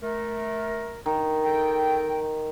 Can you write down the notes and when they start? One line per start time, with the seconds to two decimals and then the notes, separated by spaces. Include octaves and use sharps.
0.03 A3 A#4
1.06 D#3
1.44 A4 D#5 G5